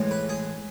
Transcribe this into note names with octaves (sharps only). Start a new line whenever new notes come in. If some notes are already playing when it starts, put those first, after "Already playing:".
Already playing: A2 E3 G#3
B4
G#4